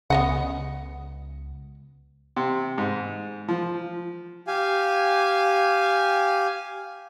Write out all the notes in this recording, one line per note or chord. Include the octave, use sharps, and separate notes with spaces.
C#2 B3 D#5 F#5
C3
G#2
F3
G4 F5 G#5